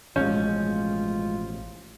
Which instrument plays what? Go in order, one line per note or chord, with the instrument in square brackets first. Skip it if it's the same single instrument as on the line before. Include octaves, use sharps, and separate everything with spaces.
[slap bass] A1 B2 F3 [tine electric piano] G#3 G6 [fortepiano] C#4 [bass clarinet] F4